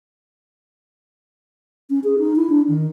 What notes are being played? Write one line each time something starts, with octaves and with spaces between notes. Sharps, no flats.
C#4
G#4
D#4
E4
D4
D#3